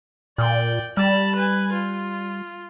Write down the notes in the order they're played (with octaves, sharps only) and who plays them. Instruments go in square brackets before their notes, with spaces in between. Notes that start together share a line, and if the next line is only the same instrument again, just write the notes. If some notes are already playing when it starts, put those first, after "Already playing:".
[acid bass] A#2 [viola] D5 G5
[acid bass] G3 [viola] A5 B5
[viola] B4 G#5
F4